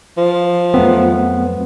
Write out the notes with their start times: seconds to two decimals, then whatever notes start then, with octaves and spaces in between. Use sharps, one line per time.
0.18 F3
0.74 F2 F#3 A3 B3 C4